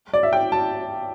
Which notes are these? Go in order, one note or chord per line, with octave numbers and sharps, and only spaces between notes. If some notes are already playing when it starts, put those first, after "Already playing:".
D5
E5
G5
A5